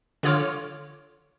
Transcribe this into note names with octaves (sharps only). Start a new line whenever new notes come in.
D3 F4 C#5 D6 F6